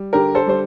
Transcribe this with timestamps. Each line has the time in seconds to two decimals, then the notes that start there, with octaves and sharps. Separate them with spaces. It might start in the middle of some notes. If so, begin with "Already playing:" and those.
Already playing: G3
0.13 D3 G4 A#4
0.35 A4 C5
0.46 G3 C5